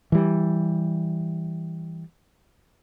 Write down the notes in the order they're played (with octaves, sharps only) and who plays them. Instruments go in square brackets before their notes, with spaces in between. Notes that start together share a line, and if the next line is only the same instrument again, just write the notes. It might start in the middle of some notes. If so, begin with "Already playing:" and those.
[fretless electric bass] E3 G3